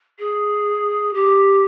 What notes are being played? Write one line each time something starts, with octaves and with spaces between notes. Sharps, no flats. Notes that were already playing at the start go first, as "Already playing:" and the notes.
G#4
G4